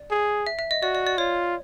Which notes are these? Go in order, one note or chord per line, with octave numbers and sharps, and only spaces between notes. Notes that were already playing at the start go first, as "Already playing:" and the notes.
Already playing: D5
G#4
E5
E5
D#5
F#4 D5
D5
D5
F4 C#5